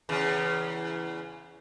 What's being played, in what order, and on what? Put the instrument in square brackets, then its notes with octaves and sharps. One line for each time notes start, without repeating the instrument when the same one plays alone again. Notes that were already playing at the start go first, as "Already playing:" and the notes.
[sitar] E2 C#3